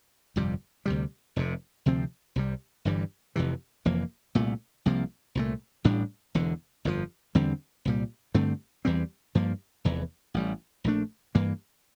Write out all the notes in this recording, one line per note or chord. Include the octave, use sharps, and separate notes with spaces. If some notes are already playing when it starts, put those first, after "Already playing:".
G1 F2 C3 G3
D2 C3 G3
F1 F2 C3
D2 C3 F3 C4
C2 C3 G3
G1 G2 E3 G3
F1 F2 C3 E3
F1 F2 E3 A#3
C2 A#2 A3
C2 C3 F3 A#3
C2 A#2 A3
A1 A2 G3 D4
E1 E2 D3
G1 F2 C3 F3
E2 D3 G3 C4
C2 A#2 G3
G2 D3 A3 C4
E2 E3 G3 C4
G2 F3 A#3
F1 E2 E3
A1 A2 G3
A#1 A#2 A3 D4
G2 E3 A#3